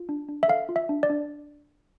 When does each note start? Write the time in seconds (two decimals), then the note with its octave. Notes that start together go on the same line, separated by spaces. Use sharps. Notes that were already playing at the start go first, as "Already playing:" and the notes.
Already playing: F4
0.09 D4
0.29 D4
0.43 E5
0.48 A4 F5
0.69 F4
0.76 E5
0.89 D4
1.03 D5
1.10 D4